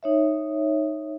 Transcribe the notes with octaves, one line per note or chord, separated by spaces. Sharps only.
D#4 C#5 E5